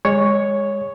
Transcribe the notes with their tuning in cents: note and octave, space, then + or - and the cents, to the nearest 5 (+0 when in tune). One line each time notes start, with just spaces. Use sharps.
G#3 -25 C#5 +0